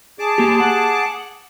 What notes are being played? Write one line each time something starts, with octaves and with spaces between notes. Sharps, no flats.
G#4 A5 D6
A#3 G4
F#5